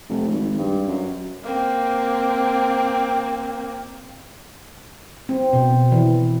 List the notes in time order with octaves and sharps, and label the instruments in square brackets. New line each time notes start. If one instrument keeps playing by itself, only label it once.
[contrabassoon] F1
G#1
G2
F#2
[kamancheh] A#3 C4
[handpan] C4
B2
E3